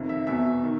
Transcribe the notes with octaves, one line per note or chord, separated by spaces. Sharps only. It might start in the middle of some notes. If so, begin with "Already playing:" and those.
Already playing: F2 C3 D#3
E5
E2 B2 E5
D#3